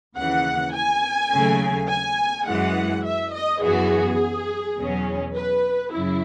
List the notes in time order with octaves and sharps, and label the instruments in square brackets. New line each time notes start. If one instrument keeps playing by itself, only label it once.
[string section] D#2 C#3 E3 [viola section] F#5
[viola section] G#5
[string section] D#2 C#3 F#3 A3
[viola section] G#5
[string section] F#2 E3 G#3 [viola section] F#5
[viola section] E5
D#5
[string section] F#2 E3 B3 F#4 [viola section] G#4
[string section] E2 B2 F#3 C#4
[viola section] B4
[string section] F#2 C#3 F#3 [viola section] E4